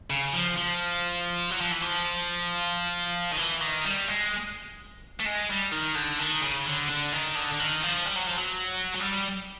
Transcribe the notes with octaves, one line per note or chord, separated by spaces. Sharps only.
C#3
F3
F3
F#3
F3
E3
F3
D#3
E3
D#3
G3
G#3
A3
G#3
G3
D#3
D3
D#3
C#3
D3
D3
D#3
D3
D3
D#3
F3
G3
F#3
F3
F#3
F#3
G3